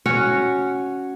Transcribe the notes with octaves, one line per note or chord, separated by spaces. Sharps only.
C#4 F#4 C#5